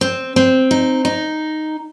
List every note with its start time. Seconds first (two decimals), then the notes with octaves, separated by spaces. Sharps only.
0.01 C4
0.36 C4
0.71 D#4
1.05 D#4